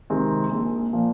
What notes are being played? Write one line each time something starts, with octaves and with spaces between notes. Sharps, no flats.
C3 D#3 G#3 C4
A#1
A#2 F3